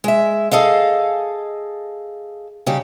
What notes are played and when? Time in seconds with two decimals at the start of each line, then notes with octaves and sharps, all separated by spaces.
0.04 G#3 E5
0.51 G#4 A4 D#5 F5
2.66 C#3 G3 D#4 G4